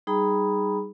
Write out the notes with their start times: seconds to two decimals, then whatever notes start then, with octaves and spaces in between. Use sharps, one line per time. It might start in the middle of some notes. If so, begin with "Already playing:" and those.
0.07 G3 D#4 G#4 A#5 B5